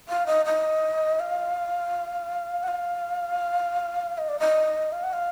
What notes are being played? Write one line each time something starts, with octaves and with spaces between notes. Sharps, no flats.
F5
D#5
D#5
F5
F#5
F5
D#5
D5
D#5
F5
F#5
F5